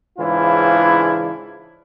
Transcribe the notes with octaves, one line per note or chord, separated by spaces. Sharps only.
G#2 C#3 E3 D4 E4 F4